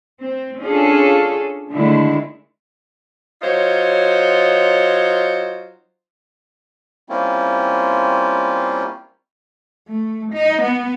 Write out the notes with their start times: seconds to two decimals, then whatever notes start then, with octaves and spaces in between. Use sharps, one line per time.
0.20 C4
0.61 C#4 D4 F4 G#4 A4
1.72 D3 D#3 G#3 A3 E4
3.42 F#3 D#4 F4 C5 C#5
7.09 G3 A#3 C4 C#4 E4 F4
9.89 A3
10.33 D#4
10.63 B3